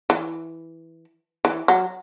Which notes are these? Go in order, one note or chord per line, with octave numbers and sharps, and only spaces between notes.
E3
E3
F#3